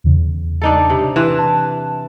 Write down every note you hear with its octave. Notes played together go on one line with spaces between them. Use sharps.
E2 C#3
D4 D#4 A4
C3
E3 C6 F#6 E7
A5